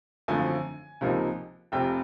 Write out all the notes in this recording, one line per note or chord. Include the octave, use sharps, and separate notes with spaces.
G#1 F#2 D3 F3 A3 G#5
C#2 C3 F3 A#3 D#4
F1 F2 C3 G5